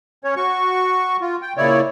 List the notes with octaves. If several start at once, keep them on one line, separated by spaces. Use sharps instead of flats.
C#4 C#5
F#4 C#6
F4
G5
A#2 C#3 E4 C#5 D5